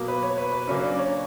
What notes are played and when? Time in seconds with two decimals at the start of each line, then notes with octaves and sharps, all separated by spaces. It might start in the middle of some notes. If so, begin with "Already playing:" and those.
Already playing: B2 F#3 A#3
0.08 B4
0.22 C#5
0.38 B4
0.52 B4
0.67 C#3 F#3 A#3 C#4
0.83 D4
0.99 C#5